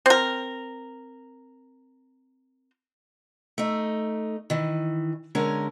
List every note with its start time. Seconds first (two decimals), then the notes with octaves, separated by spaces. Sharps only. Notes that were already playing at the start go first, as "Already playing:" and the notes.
0.06 C4 A#4
3.58 A3 D#4
4.50 D#3 E3
5.35 D3 G#3 C#4 A#4